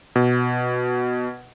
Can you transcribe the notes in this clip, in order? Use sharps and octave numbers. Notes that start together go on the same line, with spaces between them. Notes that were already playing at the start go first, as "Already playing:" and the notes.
B2